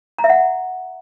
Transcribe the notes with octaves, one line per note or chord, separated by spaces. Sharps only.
A#5
E5
F#5